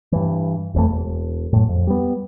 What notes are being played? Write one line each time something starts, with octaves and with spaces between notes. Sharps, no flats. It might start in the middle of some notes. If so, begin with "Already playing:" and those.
G2 E3
F#1 F2 E3 A3
E1
F#2 A2
F2
G3 B3